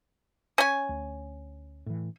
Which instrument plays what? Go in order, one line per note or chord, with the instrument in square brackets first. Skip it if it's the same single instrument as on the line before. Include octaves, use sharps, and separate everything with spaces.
[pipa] C#4 G#5
[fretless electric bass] D2
A2 E3